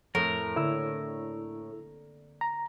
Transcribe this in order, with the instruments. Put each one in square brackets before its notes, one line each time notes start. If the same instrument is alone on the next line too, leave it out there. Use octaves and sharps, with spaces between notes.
[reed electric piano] F2 [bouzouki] A2 [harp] A3 C4 [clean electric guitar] A#4
[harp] D3 A#3 [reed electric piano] E4 E6
[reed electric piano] A#5